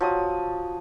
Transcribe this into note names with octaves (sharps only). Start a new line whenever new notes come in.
F3 F#3 D#6